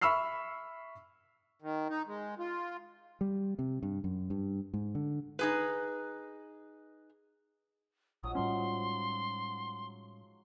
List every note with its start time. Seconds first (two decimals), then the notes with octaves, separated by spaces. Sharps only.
0.02 E5 B5 C#6 E6 F6 C7
1.62 D#3
1.90 D#4
2.07 G#3
2.39 F4
3.21 G3
3.59 C3
3.83 G2
4.04 F#2
4.30 G2
4.74 G#2
4.95 D3
5.39 D#4 G#4 B4
8.23 A#1 G#2 F3 F#3 D#6
8.35 A2 G3 C#4 C6